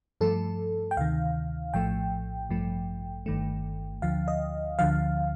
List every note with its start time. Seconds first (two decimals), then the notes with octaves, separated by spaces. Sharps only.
0.21 G2 F3 A3 A4
0.91 G5
0.97 D2 C3 D#3 F5
1.74 A#1 A2 F3 A3 G5
2.49 A1 G2 F3 A3
3.26 G1 G2 D#3 A3
4.02 D2 D3 F3 F5
4.28 D#5
4.79 D2 D3 F3 F5